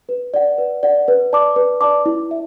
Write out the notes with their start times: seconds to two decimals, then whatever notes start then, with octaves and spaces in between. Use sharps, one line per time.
0.09 B4
0.34 D5 F#5
0.58 B4
0.83 D5 F#5
1.08 B4
1.33 D5 A5 D6
1.56 B4
1.81 D5 A5 D6
2.06 E4
2.31 E5